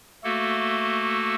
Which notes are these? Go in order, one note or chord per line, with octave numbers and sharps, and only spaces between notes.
A3 A#3 F#4 A4